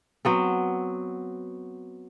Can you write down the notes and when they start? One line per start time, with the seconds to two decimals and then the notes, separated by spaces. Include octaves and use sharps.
0.25 F#3 B3 C4